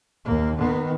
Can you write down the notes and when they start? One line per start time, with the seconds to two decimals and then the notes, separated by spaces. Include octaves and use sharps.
0.25 D#2 A#3
0.56 D#3 B3